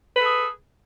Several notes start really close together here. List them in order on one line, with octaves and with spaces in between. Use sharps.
B4 A4 G#4